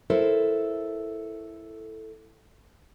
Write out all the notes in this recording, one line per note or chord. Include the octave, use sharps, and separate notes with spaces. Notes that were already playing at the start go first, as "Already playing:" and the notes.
E4 A4 A#4 C5